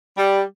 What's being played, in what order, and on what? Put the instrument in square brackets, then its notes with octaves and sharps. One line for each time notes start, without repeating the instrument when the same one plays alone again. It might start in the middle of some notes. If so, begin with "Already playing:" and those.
[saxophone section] G3